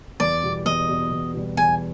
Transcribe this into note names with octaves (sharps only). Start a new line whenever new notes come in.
E2 D5
B2 G3
E2 D#5
B2 G3
E2
B2 G3
E2 G#5